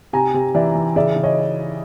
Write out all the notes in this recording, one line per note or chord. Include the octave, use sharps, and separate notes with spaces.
C3 G#5 A#5
C3
E3 D5 E5
E3
C#3 D5 E5
C#3
C#5 D#5